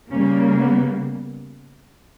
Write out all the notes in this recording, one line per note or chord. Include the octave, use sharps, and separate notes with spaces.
C#3 G3 A#3 C#4
B3